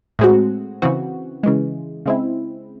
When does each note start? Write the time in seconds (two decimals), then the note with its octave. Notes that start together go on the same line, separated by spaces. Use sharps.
0.19 A2 G#3 C4 F#4
0.82 C#3 E3 C4 F#4
1.43 C#3 E3 G#3
2.06 C#3 G#3 C4 E4